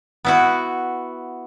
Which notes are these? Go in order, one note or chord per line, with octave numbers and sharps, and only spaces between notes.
B3 E4 F#4